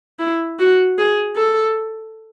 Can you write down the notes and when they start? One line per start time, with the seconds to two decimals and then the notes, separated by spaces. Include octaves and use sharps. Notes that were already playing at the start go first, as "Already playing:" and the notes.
0.19 E4
0.59 F#4
0.98 G#4
1.36 A4